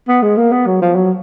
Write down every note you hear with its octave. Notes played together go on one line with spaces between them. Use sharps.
B3
G#3
A#3
B3
F#3
F3
F#3